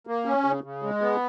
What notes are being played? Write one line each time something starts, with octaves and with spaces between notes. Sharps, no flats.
A#3
C#4
C#3
C#3
G#3
B3